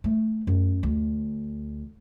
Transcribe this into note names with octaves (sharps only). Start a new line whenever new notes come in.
A3
F#2
D2